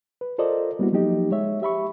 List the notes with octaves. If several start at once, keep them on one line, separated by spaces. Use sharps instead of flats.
B4
F4 A4 A#4 C5 D5 D#5
G3 A#3 B3 E4 F#4
F3 F#3 A#3 D#4 G4 D#5
G#3 C#5 E5
G4 E5 B5 C#6